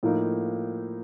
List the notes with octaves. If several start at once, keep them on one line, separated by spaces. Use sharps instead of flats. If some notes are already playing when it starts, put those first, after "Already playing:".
A2 F3 A#3 D#4